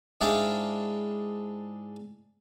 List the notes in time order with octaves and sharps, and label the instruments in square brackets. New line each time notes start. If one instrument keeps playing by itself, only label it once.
[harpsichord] G#2 G#3 D4 E4 F5 G5